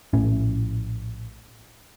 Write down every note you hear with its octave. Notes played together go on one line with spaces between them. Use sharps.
A#1 A2 C#4